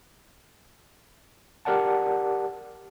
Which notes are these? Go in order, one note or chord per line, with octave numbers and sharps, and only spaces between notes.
G4 A#4 D5 F#5 A5